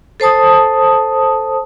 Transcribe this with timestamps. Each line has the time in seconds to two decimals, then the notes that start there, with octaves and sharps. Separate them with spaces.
0.20 A4 C5 A5 D#6